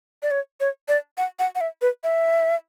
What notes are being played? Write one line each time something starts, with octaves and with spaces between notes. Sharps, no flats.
D5
C#5
C#5
D5
F#5
F#5
F#5
E5
B4
E5